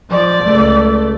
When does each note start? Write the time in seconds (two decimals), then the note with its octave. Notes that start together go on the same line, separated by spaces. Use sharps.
0.10 F3 D5
0.43 C#2 A3